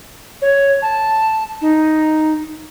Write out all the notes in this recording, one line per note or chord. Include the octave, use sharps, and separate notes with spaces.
C#5
A5
D#4